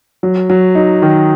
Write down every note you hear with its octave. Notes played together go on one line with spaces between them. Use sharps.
F#3
F#3
D#4
D#3